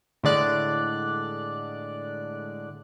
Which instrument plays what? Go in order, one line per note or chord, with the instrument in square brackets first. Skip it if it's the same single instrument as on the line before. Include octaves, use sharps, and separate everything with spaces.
[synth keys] A2 D3 G#3 D5 F#6